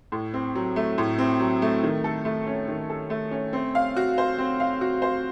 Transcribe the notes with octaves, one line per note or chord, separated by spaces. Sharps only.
A2
C4
F#3
A3
A2
C4
F#3
A3
D#3
A4
A3
C#4
D#3
A4
A3
C#4
C4
F5
F#4
C5
C4
F5
F#4
C5